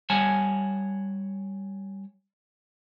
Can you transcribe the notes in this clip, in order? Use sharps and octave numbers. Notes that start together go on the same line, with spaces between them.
G3 C#5 F#5 G#5 A5